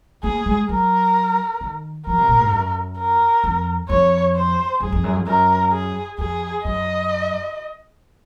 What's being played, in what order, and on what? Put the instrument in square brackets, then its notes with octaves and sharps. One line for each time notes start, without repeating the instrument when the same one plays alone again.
[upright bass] A#3 [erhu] G#4
[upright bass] G#3
[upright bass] F#3 [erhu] A#4
[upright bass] D#3
[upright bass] F3 [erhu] A#4
[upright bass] C3
A#2
G#2
F#2
[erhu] A#4
[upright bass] F2
[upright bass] F2 [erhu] C#5
[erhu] C5
[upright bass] F#2 [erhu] G#4
[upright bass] F2
F#2
F2
[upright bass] F#2 [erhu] A#4
[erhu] G#4
[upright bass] F2 [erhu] G#4
[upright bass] F#2 [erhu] D#5